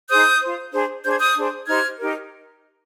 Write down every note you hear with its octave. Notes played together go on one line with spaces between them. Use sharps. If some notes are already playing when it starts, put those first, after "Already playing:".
D#4 G#4 C5 D#6 G6
F4 C5
D4 G#4 C5
D4 G#4 C5 G6
G#6
D#6 G6
D4 G#4 C5
D#4 G4 C5 F6 G#6
D#4 G4 A#4